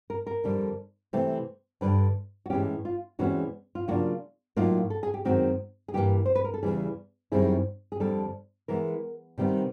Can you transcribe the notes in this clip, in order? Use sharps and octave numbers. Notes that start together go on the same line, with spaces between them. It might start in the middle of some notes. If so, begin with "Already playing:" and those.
A#4
A#4
F2 D3 G3
C3 E3 A3 C4
G2 D3 G3 B4
F#4
A2 E3 G#3 C#4 G4
F4
E2 C3 E3 G#3 C#4 F#4
F4
C#3 F#3 A#3 D4 F4 F#4
A2 F#3 A#3 D#4 F4
A4
G#4
G4
F#2 D#3 G#3 C4 F#4
G#4
G2 E3 G3 A#3 G4
C5
B4
A#4
A4
E2 C#3 E3 G3 G#4
F#2 D#3 G3 C4 E4 G#4
G#4
F2 D3 G3 A4
E3 G#3 B3 A#4
C3 D#3 G3 B3